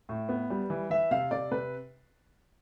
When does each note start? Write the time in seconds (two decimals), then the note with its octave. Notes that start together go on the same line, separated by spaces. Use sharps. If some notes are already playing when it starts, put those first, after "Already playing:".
0.09 A2
0.29 B3
0.50 G3
0.70 E3
0.90 E3 E5
1.11 C3 F5
1.31 C3 D5
1.52 C3 B4